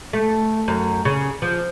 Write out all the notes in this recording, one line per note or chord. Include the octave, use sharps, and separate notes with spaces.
A3
F#2
C#3
F3